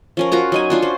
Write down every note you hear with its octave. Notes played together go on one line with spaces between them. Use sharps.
F3 C#4 A#4
F4 F#4 A#4 A#5
F#3 D#4 G#5
D4 F4 F#4
C#4 C5